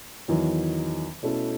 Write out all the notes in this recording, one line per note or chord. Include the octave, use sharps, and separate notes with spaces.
E2 D#3 F#3
B2 A3 C#4 E4 A4